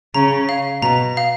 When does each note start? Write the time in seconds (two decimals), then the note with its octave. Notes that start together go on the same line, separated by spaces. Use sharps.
0.14 C#3 A#5
0.49 F5
0.82 B2 A#5
1.17 F5